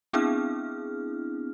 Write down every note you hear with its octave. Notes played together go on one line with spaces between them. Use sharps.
B3 C4 D4 E4 G#4 F6